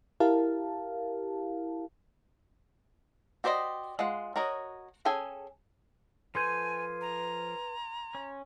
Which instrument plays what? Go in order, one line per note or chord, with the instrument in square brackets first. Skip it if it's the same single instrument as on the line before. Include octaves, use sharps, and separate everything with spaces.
[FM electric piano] E4 G4 A#4 F5 A5
[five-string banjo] F#4 G4 C5 D5 D#5
G#3 F4 F#5
F#4 A#4 C#5 D#5
C#4 G#4 A4 G5 G#5
[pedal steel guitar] F3 A4 G6 [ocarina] B4 [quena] G#5 [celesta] C6 G#6 D#7
[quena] A#5
[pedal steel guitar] C#4